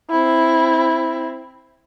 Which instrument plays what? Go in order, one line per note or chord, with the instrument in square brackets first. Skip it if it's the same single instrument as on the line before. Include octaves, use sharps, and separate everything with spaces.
[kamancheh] C4 E4